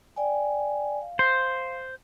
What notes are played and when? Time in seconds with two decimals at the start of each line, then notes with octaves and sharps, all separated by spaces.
0.16 D5 G5 G#5
1.02 F5
1.19 C5